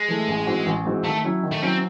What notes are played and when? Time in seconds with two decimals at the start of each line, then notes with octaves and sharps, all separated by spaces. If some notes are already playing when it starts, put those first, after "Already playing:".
Already playing: G#3
0.08 E3 A3
0.28 A1
0.46 G#2 E3 C4 F#4
0.66 A1
0.85 G#2 E3 C4 F#4
1.04 D#3 A3
1.24 F#3 C#4 E4
1.43 D#3
1.51 A3
1.62 F#3 C4 C#4 E4